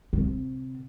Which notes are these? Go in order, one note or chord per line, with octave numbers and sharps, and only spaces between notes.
C3